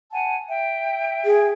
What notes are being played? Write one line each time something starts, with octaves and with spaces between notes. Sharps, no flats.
F#5 G#5 A5
E5 G5
G#4